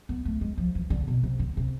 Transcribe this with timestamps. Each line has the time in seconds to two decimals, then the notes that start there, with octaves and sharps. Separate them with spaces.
0.09 B3
0.25 A3
0.41 G#3
0.58 F3
0.75 E3
0.90 D3
1.08 B2
1.23 C3
1.39 D3
1.57 C3